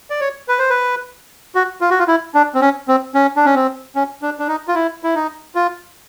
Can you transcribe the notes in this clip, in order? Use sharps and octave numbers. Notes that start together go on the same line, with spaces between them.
D5
C#5
B4
C5
B4
F#4
F4
F#4
F4
E4
D4
C4
C#4
C4
C#4
D4
C#4
C4
C#4
D4
D4
D#4
F4
E4
E4
D#4
F4